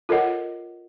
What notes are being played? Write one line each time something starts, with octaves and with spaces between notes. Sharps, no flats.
F4 A4 A#4 C#5 D#5 F#5